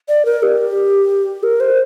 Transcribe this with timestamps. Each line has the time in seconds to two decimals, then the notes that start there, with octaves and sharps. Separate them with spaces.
0.09 D5
0.25 A#4
0.43 G4
1.43 A#4
1.60 C5